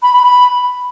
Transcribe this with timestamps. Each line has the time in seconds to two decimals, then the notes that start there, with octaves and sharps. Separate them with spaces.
0.03 B5
0.13 B5
0.23 B5